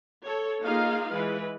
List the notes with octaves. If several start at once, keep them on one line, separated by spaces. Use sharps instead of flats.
A4 C#5
A#3 D#4 F4 G#4 D#5 F5
E3 G#3 B4